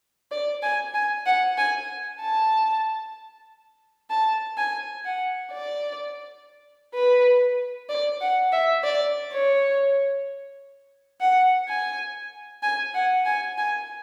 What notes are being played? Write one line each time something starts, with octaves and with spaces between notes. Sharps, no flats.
D5
G#5
G#5
F#5
G#5
A5
A5
G#5
F#5
D5
B4
D5
F#5
E5
D5
C#5
F#5
G#5
G#5
F#5
G#5
G#5